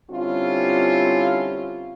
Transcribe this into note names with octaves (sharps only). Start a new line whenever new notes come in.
D3 G3 C4 C#4 E4 F4